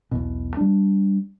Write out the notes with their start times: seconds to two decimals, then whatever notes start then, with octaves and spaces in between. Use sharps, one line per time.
0.11 B1 E2 B2
0.57 G3 D4